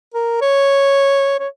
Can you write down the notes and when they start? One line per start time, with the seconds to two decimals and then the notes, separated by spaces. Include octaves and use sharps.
0.14 A#4
0.41 C#5
1.39 C#5